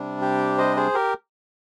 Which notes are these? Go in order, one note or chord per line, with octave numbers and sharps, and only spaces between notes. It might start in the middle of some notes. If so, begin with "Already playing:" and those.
Already playing: C3 G3 D4
G4
C5 D#5
G#4 C5
G4 A#4